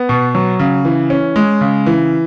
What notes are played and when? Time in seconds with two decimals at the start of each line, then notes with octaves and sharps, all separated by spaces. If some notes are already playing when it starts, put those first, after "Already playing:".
Already playing: B3
0.09 B2
0.35 F#3
0.59 C#3
0.85 E3
1.10 C#4
1.36 G#3
1.61 C#3
1.86 E3